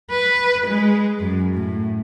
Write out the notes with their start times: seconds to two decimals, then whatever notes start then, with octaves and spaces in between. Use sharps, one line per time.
0.10 B4
0.66 G#3
1.19 F#2
1.54 A2